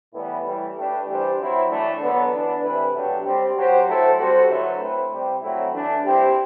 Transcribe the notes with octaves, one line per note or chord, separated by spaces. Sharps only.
A2 E3 G3 B3 E4
A2 E3 G3
A3 D4 G4 B4
E3 G3 D4 G4 C5
F#3 C4 E4
A2 E3 A3 D4
D3 F#3 B3 D4 A4
E3 B3 D4
C3 E3 A3 E4 B4
B2 F#3 A3 D4 G4
G3 C4 G4
F#3 C4 G4 C5
F#3 A3 E4 A4 C5
G3 C4 F#4 A4 C5
D3 F#3 A3 E4 B4
A3 C4 E4 B4
C3 G3 C4 G4 C5
A2 F#3 A3 C4 E4
E3 A3 D4
G3 C4 E4 G4